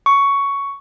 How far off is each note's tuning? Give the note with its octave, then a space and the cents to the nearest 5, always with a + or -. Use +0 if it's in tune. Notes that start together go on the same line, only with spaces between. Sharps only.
C#6 +10